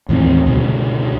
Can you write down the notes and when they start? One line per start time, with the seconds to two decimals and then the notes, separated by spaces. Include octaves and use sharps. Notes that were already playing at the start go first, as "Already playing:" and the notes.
0.09 D#2 A2 E3 C4
0.46 C#2 G2 B2 D3